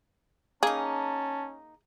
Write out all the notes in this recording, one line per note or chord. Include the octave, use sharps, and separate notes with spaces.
A#3 C#4 D#4 G#4 A5